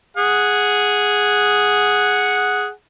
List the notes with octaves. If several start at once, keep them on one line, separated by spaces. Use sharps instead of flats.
G#4 F#5